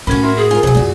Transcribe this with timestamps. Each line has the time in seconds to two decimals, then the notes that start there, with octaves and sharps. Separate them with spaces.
0.07 A2 A#3 C#4 F#4 B5 G#6
0.23 E4 A#4 C6
0.36 G#4
0.51 F4 A#4 G#5
0.63 B2 E3 F#3 G#5
0.75 F#2 A#2 F#4